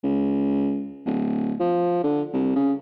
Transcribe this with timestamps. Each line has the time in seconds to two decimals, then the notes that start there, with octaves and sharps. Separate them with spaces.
0.03 C#2
1.06 D1
1.60 F3
2.04 D3
2.34 C2
2.56 C#3